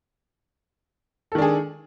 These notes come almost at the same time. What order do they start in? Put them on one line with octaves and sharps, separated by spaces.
A4 D#3 D4 G#4